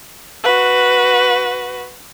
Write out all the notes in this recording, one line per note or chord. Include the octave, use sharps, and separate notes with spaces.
F#4 B4